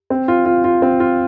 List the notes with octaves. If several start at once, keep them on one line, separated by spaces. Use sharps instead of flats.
C4
F4
F4
F4
C4
F4